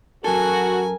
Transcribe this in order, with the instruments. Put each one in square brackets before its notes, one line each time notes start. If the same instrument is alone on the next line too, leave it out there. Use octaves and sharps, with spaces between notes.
[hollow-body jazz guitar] F#2 A4 [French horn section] F#4 [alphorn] A#4 [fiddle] G#5